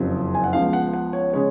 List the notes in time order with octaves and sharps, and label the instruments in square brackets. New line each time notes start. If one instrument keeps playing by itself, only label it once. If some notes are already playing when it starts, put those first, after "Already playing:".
Already playing: [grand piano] F#1 F2 C#3 F#3
G#5
F#5
C#2 C#3 F3 B3 F5
F#5
F#5
C#5
C#3 G#3 C#5